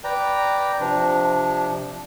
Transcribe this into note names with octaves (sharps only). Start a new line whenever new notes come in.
B4 D5 G5 A#5
C3 F3 D4